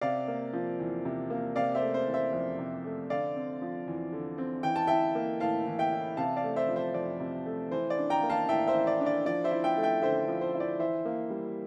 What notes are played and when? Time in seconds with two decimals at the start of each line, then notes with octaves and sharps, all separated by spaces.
0.01 C3 D5 F5
0.28 A#3
0.53 F3
0.79 E2
1.05 C3
1.30 A#3
1.56 C3 D5 F5
1.75 C5 E5
1.82 A3
1.94 C5
2.07 E3
2.14 C5 E5
2.33 F2
2.59 C3
2.85 A3
3.10 D3 D5 F5
3.36 C4
3.62 F3
3.87 E2
4.13 D3
4.38 C4
4.63 E3 G5
4.76 A5
4.87 E4 E5 G5
5.15 A#3
5.40 A2 F5 A5
5.67 E3
5.79 E5 G5
5.93 E4
6.17 C3 F5 A5
6.36 D5 F5
6.44 A3
6.56 C5 E5
6.69 F3
6.76 C5 E5
6.94 F2 D5
7.20 C3
7.46 A3
7.71 E3 C5
7.90 D5
7.98 D4
8.10 G5 A#5
8.23 A#3
8.30 F5 A5
8.49 A2 E5 G5
8.67 C5 E5
8.74 E3
8.87 D5
9.00 D4
9.06 D5
9.26 F3 D5
9.44 C5 E5
9.51 E4
9.64 E5 G5
9.77 A3
9.83 E5 G5
10.02 D3 C5 E5
10.28 F3
10.41 C5
10.54 E4
10.60 D5
10.79 E3 C5 E5
11.05 A#3
11.30 G3